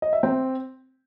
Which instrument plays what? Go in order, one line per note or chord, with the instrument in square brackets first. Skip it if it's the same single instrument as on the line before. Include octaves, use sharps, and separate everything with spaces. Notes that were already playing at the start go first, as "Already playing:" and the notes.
[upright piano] D#5
E5
C4